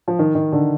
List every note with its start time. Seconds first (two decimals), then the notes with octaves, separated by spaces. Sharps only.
0.08 F3
0.19 D#3
0.35 D#3
0.52 D3